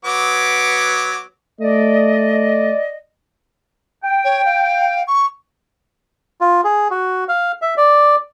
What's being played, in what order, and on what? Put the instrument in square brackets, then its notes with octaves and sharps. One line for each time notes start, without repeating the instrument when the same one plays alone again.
[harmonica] F#3 B3 D6
[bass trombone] A3 [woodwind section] D5 D#5
[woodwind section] G5
[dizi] C#5
F5
C#6
[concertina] F4
G#4
F#4
F5
E5
D5